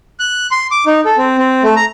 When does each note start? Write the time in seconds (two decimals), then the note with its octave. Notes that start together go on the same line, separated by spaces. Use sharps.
0.20 F#6
0.51 C6
0.71 D6
0.86 D#4
1.05 A4
1.17 C4
1.38 C4
1.63 A3
1.76 A#5